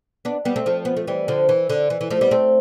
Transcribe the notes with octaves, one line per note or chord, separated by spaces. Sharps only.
B3 D4
G3 B3
A3 C4
F3 A3
B3
A3
E3 G3
D3 F3
E3
D3
E3
E3
F3 A3
G3 B3
A3 C4